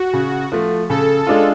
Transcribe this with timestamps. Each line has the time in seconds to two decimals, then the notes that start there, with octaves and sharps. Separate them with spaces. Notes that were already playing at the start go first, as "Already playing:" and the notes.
Already playing: F#4
0.13 C#3
0.52 F3 A3
0.90 C#3 A4
1.27 G#3 D4 F4